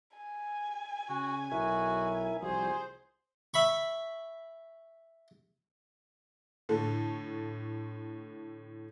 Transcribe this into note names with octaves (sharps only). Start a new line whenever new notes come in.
G#5
C#3 F#4
B1 E4 F#4 A#4 E5
C2 F3 G3 F#4 G#4 C5
E5 B5 C#6
A2 D3 A3 A4